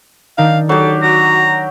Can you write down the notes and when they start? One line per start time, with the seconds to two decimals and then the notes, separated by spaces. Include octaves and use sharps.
0.38 D#3 D4 D#4 F5
0.69 F#3 G4 A4
1.02 F#4 A#5